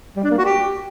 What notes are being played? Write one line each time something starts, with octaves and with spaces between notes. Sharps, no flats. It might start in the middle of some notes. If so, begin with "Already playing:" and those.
G3
D4
A#3
F#4
G4